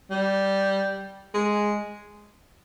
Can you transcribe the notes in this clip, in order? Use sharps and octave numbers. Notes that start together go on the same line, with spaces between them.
G3
G#3